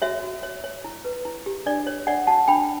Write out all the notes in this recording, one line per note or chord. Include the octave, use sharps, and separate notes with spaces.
F#4 C#5 E5
F#4
C#5
C#5
E4
B4
E4
G4
D4 D5
C#5
D4 D5 F#5
F#4 F#5 A5
D4 G5 B5